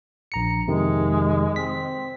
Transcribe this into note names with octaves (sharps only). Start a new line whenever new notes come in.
A#1 A#5 C#7
F2 C3 D#3 G#3
C4 B6